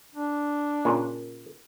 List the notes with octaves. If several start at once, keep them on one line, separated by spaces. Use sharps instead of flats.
D4
A#2 C#3